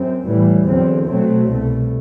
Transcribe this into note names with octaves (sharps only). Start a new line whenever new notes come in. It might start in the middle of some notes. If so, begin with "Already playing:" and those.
Already playing: F#2 C4
A2 E3 G3
E2 D3 F#3 C4
B2 F#3 A3 C4
C2 B2 A3